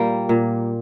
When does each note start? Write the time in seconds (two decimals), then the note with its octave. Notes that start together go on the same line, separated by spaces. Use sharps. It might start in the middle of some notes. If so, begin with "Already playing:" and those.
Already playing: A#2 G3 A#3
0.29 A#2